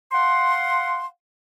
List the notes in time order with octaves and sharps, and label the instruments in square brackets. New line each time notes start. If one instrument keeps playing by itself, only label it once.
[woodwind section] F5 F#5 C6